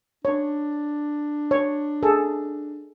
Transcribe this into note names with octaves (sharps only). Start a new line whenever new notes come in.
D4 C#5
C#5
G#4 A4